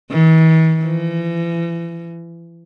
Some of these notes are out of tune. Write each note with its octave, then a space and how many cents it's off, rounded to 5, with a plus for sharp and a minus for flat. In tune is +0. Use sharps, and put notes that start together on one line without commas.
E3 -45
E3 +40